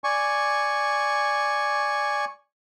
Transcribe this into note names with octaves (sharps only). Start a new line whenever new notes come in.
D5 G#5 C#6